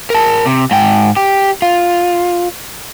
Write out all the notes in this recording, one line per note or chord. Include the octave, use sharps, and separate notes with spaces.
A#4 A5
C3
G#2 G5
G4
F4